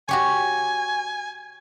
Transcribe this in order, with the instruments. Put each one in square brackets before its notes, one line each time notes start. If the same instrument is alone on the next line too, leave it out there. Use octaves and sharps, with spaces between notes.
[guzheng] F#4 G4 C#5 [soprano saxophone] G#5